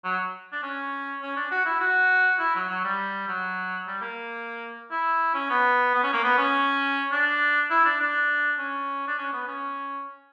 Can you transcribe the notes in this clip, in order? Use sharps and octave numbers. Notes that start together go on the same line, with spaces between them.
F#3
D4
C#4
C#4
D4
F#4
E4
F#4
E4
F#3
F#3
G3
F#3
G3
A#3
E4
C#4
B3
B3
C#4
A#3
B3
C#4
D4
E4
D4
D4
C#4
D4
C#4
B3
C#4